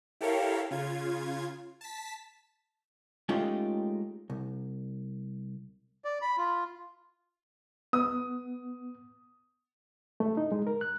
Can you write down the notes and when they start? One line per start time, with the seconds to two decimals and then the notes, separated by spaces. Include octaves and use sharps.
0.21 E4 G4 A4 A#4 C#5 F5
0.70 C#3 F4 G#6
1.81 A5 B6
3.29 G#3 A3 C#4 D#4 F4 G4
4.30 C2
6.05 D5
6.22 B5
6.38 F4
7.93 B3 D#6
10.20 A3
10.37 D#4
10.52 G#3
10.67 A#4
10.81 F#6